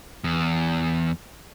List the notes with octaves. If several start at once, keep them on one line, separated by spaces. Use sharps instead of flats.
E2